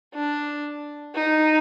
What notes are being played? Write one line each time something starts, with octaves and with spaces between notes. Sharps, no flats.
D4
D#4